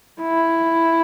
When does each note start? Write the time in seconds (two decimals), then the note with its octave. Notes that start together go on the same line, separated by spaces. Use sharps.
0.22 E4